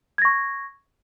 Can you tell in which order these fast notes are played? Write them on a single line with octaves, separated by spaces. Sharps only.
G#6 A#6 C#6